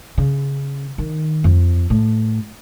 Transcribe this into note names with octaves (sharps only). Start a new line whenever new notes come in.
C#3
D#3
F2
A2